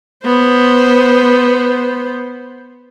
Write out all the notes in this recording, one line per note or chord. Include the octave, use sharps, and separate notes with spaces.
B3 C5